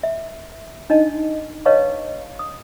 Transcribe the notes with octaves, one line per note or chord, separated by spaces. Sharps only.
E5
D4 D#4 D#5 A5
B4 C#5 D#5 F5 A5 C#6
D#6